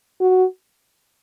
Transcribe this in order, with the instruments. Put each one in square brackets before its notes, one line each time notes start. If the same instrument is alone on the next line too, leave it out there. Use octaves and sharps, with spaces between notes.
[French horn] F#4